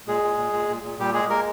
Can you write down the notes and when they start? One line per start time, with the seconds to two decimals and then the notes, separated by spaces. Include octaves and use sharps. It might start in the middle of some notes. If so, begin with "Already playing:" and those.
0.07 A#2 G#3 G#4
0.23 A#2
0.38 A#2
0.53 A#2
0.69 A#2
0.84 A#2
0.99 A#2 G3 G4
1.14 G#3 G#4
1.30 G#3 A#3 A#4